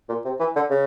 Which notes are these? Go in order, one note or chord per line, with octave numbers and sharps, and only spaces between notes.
A#2
C3
E3
D3
C#3